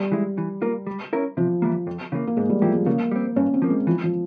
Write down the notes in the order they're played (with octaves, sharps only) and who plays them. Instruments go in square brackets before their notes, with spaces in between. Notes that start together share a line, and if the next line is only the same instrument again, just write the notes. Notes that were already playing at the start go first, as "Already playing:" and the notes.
Already playing: [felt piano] G3
[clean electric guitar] E3 G#3 E4
E3
A#3 F4 A#4
G3
C#4 E4 A#4
[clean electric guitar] C3 [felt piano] F3
[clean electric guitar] E3 G3 A#3
F2
C#3 E3 A#3
[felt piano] A#3
[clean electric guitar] G#2 [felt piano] G#3
[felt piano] G3
[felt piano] F3 [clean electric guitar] G3 A#3 E4 G4
[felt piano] G#3
[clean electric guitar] C#3 [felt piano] A#3
[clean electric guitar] G3 C4
[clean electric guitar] G2 [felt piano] C#4
[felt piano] C4
[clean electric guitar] F3 A#3
[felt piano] G#3
[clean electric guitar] E3 [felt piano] F3
[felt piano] F3